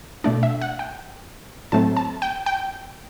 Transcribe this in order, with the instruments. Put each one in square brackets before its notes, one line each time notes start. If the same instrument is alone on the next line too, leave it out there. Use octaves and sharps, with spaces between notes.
[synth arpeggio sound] B2 A3 D4 D5
E5
F#5
G5
A2 F#3 A3 C4 A5
A5
G5
G5